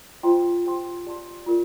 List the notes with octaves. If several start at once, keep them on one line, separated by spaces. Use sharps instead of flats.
F4 C5 D#5 G5 C6
G4 C5 G5 C6
G4 D5 A5 C6
F4 A#4 D5